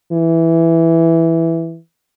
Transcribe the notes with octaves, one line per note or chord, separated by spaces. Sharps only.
E3